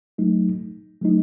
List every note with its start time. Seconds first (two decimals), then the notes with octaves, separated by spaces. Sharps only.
0.18 F#3 A3 D#4
1.01 F#3 A3 D#4